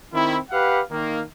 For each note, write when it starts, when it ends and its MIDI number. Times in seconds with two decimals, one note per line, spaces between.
0.13 0.38 51
0.13 0.38 60
0.13 0.38 64
0.51 0.81 67
0.51 0.81 71
0.51 0.81 77
0.51 0.81 78
0.91 1.21 51
0.91 1.21 58